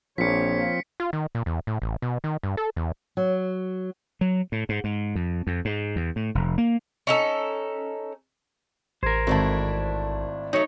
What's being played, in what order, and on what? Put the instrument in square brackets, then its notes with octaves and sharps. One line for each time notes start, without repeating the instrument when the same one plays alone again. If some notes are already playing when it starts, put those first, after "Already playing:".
[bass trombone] A#1 [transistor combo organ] F3 C4 [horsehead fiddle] A#3 C#5 [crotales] B6 C#7
[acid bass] F4
D#3
A#2
E2
A2
A1
B2
D#3
G2
A4
E2
[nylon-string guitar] F#3
[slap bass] F#3
A2
G#2
G#2
F2
F2
G#2
E2
A2
F1
A#3
[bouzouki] C#4 D#4 A4
[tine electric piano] A1 G#6 [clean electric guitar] A#4 C5
[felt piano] G#1 A5 [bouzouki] A3 D4 E4
[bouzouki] F#3 A3 [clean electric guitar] D#4 C#5